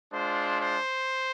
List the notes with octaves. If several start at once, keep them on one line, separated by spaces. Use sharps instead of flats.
G#3 D4 F4 C5
C5